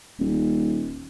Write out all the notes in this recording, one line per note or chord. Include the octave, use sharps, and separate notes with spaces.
D#1